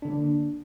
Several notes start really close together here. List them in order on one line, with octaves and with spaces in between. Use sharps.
D4 D3 A#3